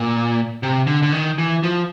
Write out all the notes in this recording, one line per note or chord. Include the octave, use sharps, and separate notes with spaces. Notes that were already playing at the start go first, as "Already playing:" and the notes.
Already playing: A#2
C3
D3
D3
D#3
E3
F3